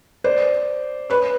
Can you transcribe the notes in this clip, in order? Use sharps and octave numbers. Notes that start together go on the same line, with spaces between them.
C5 D5
B4 C#5